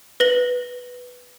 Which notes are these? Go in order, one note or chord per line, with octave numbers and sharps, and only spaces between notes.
B4 A#6 F#7